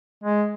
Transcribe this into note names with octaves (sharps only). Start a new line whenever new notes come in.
G#3